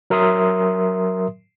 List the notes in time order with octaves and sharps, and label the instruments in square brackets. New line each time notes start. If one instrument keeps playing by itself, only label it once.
[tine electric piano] F#3 A#4 E5 C6 D#6